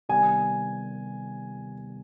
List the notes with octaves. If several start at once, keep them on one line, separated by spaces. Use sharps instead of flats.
C3 D#3 G3 B3 G#5